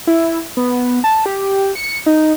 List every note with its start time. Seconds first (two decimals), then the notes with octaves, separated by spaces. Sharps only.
0.07 E4
0.57 B3
1.04 A5
1.26 G4
1.75 C#7
2.06 D#4